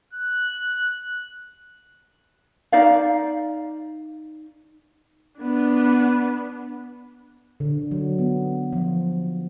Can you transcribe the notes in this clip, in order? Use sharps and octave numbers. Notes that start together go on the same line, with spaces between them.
F#6
D#4 D5 F5
B3 D4
D3
F#3
B3
F3